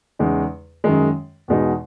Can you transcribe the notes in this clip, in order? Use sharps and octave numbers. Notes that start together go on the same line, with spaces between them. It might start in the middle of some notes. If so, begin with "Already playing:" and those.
E2 C#3 G#3 D#4
F#2 D#3 G#3
E2 B2 G#3 D#4